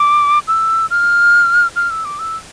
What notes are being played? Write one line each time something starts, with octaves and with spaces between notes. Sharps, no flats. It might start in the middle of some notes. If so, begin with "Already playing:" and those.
Already playing: D6
E6
F6
F6
E6
D6
E6